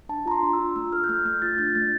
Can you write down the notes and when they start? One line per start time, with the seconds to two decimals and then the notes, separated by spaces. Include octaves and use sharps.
0.09 D4 A5
0.26 F4 A#5
0.31 C6
0.43 D4
0.53 E6
0.59 F4
0.76 A3 E6
0.92 A4 F6
1.04 G6
1.09 A3 F6
1.25 A3 G6
1.42 F4 A6
1.58 D4 G6
1.75 A3 A6